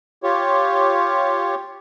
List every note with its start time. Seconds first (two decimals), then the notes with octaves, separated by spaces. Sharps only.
0.23 F4 G4 C#5